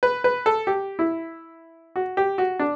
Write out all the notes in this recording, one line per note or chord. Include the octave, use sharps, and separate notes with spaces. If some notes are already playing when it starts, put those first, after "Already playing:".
B4
B4
A4
G4
E4
F#4
G4
F#4
D4